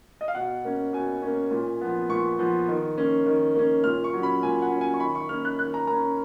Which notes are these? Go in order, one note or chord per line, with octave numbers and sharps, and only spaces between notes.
D#5
F5
B2 F#5
A#3 C#4
B2 G#5
A#3 C#4
A#2
F3 B3
A#2 C#6
F3 B3
D#3
A#3 C#4
D#3
A#3 C#4
A#2 F6
C#6
F#3
C#4 B5
A#2 G#5
F#5
F#3 C#4
G#5
C#6
D#3 B5
C#6
A#3 C#4 F6
F#6
D#3 F#6
A#5
A#3 C#4 A#5